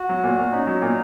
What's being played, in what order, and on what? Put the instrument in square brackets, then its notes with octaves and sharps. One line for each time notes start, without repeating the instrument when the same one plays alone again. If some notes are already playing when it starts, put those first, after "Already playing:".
Already playing: [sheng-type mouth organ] F#4
[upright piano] F#3
A#2
A#2
[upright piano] C#4 [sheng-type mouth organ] D#4
[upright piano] F#3
A#2